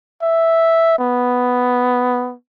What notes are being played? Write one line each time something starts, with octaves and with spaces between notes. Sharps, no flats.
E5
B3